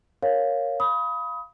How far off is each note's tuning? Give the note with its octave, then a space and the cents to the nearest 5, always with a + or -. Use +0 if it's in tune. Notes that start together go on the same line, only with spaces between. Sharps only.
A#4 +0 C#5 +0 F5 +0
F5 -5 B5 +0 D#6 +25